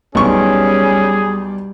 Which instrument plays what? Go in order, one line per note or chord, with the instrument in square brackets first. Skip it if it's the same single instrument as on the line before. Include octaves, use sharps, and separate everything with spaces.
[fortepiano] B1 C#6 [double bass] G3 [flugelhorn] C#4 [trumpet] G#4